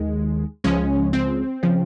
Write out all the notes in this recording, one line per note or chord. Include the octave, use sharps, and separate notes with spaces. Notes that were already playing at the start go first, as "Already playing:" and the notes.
Already playing: D#2 D#3 G#3
C#2 C#3 F3 G#3 C#4
C4
C#3 F3